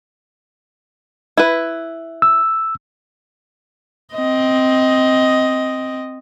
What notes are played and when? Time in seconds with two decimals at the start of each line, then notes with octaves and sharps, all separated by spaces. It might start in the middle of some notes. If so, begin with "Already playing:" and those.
1.37 E4 B4
2.22 E6
4.14 C4 D#5